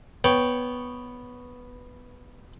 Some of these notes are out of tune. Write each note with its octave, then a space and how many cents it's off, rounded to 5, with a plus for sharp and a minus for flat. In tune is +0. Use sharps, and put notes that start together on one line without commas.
B3 +0 C#5 +0 G5 +0